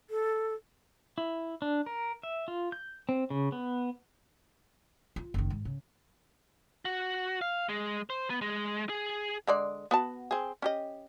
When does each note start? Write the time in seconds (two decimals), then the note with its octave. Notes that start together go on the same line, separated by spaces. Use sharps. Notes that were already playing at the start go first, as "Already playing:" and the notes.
0.10 A4
1.18 E4
1.62 D4
1.86 A#4
2.23 E5
2.48 F4
2.72 G6
3.09 C4
3.30 C#3
3.52 B3
5.16 F4
5.34 F#1 D#3
5.50 G#2
5.65 C#3
6.85 F#4
7.41 F5
7.69 G#3
8.10 C5
8.30 B3
8.42 G#3
8.89 G#4
9.47 D3 G#3 D5
9.91 B3 F#4 A5
10.31 C4 G#4
10.62 C#4 G4 D#5